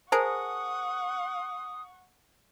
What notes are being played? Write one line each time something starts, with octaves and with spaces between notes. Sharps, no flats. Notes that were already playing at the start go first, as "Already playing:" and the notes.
G#4 A#4 C5 F#5 A5 C#6 D#6